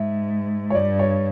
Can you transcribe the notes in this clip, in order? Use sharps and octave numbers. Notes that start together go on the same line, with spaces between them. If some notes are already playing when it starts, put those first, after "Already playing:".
Already playing: G#2 E5
C#5
G2 D5
C#5